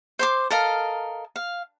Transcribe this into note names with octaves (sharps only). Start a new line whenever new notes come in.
C5 C6 D6
A4 A#4 D#5 F5
F5